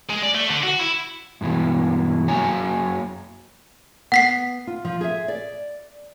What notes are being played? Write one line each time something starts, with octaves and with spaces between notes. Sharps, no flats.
G#3
D5
A3
D3
F#4
E4
G2 B2 E3 G#3
F#2 F#3 A#3 C#5 G#5 A#5
B3 F#5 B6 C7
F4
F3
G#4 E5
D5